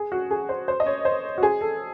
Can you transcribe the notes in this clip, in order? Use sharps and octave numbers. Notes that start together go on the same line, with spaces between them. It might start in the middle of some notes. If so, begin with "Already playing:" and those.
Already playing: G#4
F#4
G#4
C5
C5
D#5
C#5
C5
F#4
G#4
A4